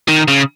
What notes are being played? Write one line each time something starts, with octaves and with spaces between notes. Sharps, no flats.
D#3
C#3